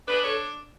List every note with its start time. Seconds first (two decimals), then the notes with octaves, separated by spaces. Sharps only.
0.07 D4 G#4 B4
0.22 A4 C#5